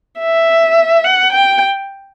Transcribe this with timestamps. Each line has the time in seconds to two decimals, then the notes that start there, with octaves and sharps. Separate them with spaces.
0.19 E5
1.04 F#5
1.32 G5